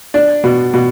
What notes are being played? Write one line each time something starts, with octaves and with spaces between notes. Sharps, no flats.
D4
B2
B2